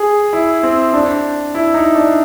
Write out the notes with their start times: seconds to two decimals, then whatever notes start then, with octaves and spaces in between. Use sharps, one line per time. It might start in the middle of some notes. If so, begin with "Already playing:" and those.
Already playing: G#4
0.33 E4
0.63 C4
0.93 D4
1.55 E4
1.74 D#4
1.95 D4